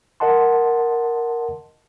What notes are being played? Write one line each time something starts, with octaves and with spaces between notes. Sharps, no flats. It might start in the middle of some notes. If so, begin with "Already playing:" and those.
A#4 D#5 F#5 A5 C6